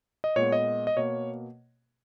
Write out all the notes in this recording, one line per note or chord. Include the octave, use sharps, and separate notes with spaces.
D#5
A#2 G#3 B3 C#5
D#5
D#5
B2 A#3 C#5